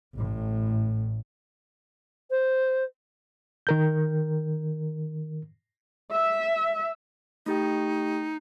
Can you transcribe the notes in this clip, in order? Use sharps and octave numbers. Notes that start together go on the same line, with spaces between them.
A1 A2
C5
D#3 A#4 G6
E5
A3 D#4 G4 G5